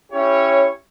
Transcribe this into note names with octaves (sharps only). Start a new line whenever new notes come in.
C#4 E4 G4 C#5